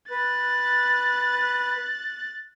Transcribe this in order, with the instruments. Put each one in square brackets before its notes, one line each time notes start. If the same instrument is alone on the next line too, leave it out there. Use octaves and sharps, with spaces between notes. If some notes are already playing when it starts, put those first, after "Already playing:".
[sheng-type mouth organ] B4 [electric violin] F#6 A6